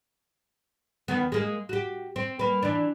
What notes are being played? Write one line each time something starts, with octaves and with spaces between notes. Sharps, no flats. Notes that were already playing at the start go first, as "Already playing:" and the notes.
E2 D#3 B3
G#3 A#3 G#4
F#4 G4
C4
A#3 B4
E3 D4